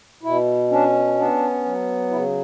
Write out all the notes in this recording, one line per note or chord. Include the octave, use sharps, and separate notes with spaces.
B2 E4
C#4 D4
B3 D4
F#3
C#3 E4